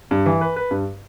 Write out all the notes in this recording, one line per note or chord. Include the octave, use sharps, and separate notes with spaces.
G2
E3
B4
B4
G2